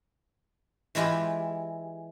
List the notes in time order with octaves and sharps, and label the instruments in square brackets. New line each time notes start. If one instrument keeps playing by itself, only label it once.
[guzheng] E3 G#3 E4 F4 G4